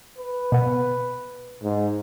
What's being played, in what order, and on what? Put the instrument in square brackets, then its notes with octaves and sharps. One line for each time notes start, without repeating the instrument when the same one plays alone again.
[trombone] B4
[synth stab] B2 B3
[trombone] G#2